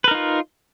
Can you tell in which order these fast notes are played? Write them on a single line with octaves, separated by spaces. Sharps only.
B4 A#4 D#4 F4